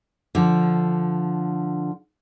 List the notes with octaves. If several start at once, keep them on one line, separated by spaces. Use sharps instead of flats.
D3 F3